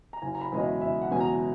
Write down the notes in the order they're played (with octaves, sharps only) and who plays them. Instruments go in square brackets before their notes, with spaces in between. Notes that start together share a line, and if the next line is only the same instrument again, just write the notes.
[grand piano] A#5
F#1 G#5
A#5
B5
E2 B2 G#3 C#4 D#5
E5
F#1 E5
F#5
E2 B2 G#3 C#4 G#5
A#5